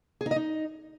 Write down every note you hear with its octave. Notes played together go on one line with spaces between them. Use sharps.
G#4
D#4
D#5
D#4